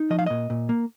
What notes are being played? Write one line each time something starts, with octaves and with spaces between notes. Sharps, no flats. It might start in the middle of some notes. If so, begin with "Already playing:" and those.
Already playing: D#4
F3 D#5
F5
A#2 D#5
A#2
A#3